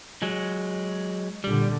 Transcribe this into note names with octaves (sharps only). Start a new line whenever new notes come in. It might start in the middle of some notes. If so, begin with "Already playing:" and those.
F#3 G#3
A#2 D3 G3